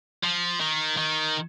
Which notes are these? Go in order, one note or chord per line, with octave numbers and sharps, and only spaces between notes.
F3
D#3
D#3